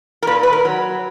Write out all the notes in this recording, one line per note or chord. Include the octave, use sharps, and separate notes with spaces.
A#4
A#2 B4
B4
A#4
F#3